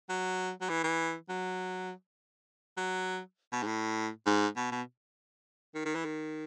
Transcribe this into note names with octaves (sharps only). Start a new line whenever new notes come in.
F#3
F#3
E3
E3
F#3
F#3
B2
G#2
A2
G#2
B2
B2
D#3
D#3
E3
D#3